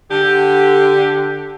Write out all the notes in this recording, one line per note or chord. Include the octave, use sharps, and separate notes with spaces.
D3 G4